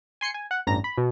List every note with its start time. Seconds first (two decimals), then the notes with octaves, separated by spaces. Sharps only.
0.21 G#5 C6 C7 C#7
0.34 G#5
0.51 F#5
0.67 A1 G2 A#5 A#6
0.84 B5
0.97 B2